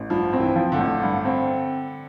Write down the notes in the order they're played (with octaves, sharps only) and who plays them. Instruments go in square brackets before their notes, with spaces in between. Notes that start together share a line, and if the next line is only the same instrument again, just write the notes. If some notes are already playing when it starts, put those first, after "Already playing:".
Already playing: [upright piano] A1
[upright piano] G2 [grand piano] F3
[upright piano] C4
[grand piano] E3
[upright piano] F3
[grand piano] D3
[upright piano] A1
G2
C4